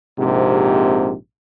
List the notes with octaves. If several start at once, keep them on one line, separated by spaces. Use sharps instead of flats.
A#1 G#2 C3